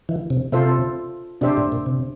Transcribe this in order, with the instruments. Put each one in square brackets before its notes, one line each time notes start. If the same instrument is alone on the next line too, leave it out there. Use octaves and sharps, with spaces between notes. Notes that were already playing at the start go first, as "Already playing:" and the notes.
[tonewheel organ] E3
C3
[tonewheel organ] C3 [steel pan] F4 A4 C5 E5
[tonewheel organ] C3 [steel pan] D4 G4 C5 E5
[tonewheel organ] A2
A#2
C3